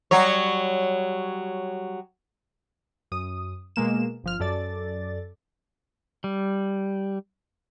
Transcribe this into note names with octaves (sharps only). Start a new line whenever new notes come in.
F#3 G3 C#5
F#2 D#6
B2 G#3 A#3 E7
G1 F3 F6
F#2 A4 D5 A6
G3